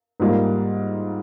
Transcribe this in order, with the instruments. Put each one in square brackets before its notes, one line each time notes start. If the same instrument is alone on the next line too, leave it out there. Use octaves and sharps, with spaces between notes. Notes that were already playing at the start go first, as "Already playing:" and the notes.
[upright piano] G#2 G3 A#3 F4